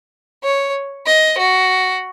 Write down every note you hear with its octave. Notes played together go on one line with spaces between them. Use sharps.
C#5
D#5
F#4